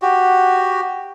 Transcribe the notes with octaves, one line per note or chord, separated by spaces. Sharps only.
F#4 G4